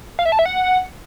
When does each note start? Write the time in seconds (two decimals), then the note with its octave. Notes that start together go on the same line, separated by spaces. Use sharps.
0.19 F5
0.25 E5
0.32 A5
0.39 E5
0.46 F#5